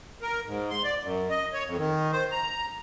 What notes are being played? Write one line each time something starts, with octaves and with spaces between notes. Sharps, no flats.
A#4
G#2
C6
D5
F#2
D#5
C#5
F2
D#3
C5
A#5